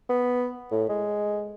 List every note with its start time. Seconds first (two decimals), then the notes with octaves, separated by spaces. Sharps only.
0.10 B3
0.71 A2
0.89 G#3